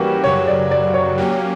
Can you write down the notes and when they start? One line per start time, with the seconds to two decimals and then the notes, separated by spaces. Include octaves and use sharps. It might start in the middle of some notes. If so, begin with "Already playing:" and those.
Already playing: E3 G3 A#3 C#4 F#4 G4 A#4 B4
0.24 F#2 C#3 F#3 C#5
0.47 D5
0.71 D5
0.94 C#5
1.18 F#3 A#3 C#4 G4